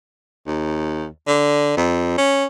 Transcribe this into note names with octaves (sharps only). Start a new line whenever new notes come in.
D#2
D3
F2
C#4